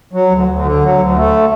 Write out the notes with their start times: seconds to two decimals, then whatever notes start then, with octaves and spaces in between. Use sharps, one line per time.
0.13 F#3
0.31 D2
0.48 D2
0.65 D3
0.82 F#3
0.98 D2
1.16 A3